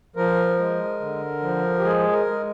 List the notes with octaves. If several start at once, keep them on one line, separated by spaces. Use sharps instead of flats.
F3 A#4
G#3
D3
F3
G4
G#3 G#4
A#4
G#3